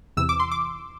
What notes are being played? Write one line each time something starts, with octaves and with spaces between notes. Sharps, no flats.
E2 C3 E3 E6
D6
C6
D6